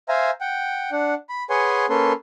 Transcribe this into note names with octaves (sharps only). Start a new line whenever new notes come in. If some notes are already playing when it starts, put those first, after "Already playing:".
C5 E5 F5 G#5 A#5
F#5 G5
D4 F#5
B5
G#4 B4 C#5 F#5 G#5 C6
A#3 C#4 A4 B4 C6